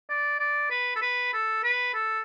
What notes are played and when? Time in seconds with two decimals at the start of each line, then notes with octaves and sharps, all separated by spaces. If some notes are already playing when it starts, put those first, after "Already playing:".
0.09 D5
0.39 D5
0.70 B4
0.96 A4
1.01 B4
1.33 A4
1.64 B4
1.94 A4